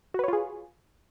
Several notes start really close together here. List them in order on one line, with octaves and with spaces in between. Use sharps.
F#4 B4 C#5 F4 G#4